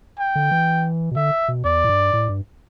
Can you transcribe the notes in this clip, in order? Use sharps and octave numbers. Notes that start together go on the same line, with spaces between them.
G5
D3
E3
B2
D3 E5
B2
E2 D5
A2
G2
A2
G2